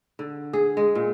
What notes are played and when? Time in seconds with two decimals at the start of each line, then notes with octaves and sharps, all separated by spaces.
0.19 D3
0.53 G#4
0.77 G#3
0.95 A#2